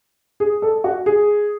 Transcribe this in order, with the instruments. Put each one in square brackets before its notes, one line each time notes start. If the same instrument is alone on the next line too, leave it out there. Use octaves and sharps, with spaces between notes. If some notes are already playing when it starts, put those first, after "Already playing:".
[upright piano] G#4
A4
F#4
G#4